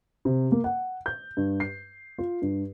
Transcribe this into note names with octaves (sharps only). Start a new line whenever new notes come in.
C3
A#3
F#5
G6
G2
C7
F4
G2